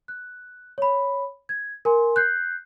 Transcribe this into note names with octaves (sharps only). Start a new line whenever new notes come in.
F#6
C#5 B5
G#6
A#4 G#5 C6
F#6 G6 C7